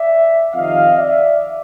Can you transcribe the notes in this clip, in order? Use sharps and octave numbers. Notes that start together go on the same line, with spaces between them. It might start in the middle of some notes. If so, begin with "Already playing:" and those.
Already playing: D5 E5
F2 C3 D#3 D#5 F5
D5 E5